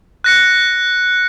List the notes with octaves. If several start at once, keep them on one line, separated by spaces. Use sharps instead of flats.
F#6 A#6 C#7